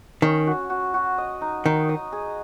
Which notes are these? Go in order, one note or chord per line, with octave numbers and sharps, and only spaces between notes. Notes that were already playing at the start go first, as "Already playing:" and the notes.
D#3 C#4
F#4
F#4
F#4
D#5
D#4
D#3 D#4
D#5
G#4